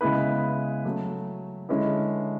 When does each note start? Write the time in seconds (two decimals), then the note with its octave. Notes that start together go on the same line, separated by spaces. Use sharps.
0.01 C#3 G#3 B3 E4 B4
0.85 F#3 A3 C#4
1.69 D3 G#3 C#4 E4 B4